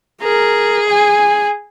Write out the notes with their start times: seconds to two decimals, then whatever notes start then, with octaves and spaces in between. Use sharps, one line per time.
0.22 G#4 A#4
0.90 G#5